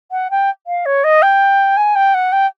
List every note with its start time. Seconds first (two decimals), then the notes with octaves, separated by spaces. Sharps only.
0.11 F#5
0.31 G5
0.67 F5
0.85 C#5
1.04 D#5
1.22 G5
1.77 G#5
1.95 G5
2.14 F#5
2.32 G5